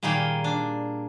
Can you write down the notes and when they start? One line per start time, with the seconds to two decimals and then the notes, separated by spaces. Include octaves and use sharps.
0.03 A#2 D#3 G3 A#3 G#4 G5
0.44 D4